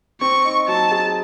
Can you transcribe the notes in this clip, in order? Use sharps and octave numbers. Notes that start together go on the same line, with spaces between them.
C4 C#6
D#4
F#3 A5
G#4